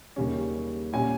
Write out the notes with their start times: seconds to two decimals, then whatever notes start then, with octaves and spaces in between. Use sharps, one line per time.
0.16 D#2 C#3 G3 C#4
0.93 A#2 G3 C#4 G#5